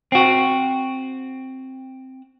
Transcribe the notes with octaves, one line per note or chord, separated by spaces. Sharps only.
C4 F#4